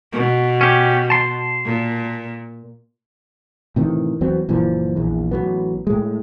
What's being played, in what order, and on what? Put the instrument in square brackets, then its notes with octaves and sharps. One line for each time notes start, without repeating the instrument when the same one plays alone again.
[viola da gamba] B2
[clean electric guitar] C#4 G4
A5 C6
[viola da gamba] A#2
[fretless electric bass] A2 C3 D#3 E3
E2 F#3 B3 C4
F#1 A#2 E3 F3
A#1 E2
A1 E3 F#3 B3
A2 G#3